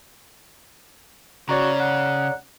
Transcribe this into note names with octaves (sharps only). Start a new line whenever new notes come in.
C#3 F#4 C#5 D5 A#5
F#5